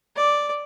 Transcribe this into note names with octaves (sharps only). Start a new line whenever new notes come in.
D5